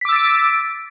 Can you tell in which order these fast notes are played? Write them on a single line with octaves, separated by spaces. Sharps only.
B6 D6 E6 A6 D7